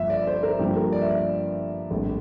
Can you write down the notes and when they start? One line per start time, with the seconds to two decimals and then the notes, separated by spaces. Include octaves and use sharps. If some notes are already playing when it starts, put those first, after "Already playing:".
Already playing: G1 G2 F3 A#3 E5
0.10 D5
0.27 C5
0.43 A#4
0.59 G2 F3 A#3 G4
0.76 A#4
0.92 D5
1.01 E5
1.09 D5
1.91 A#1 A2 G3 C4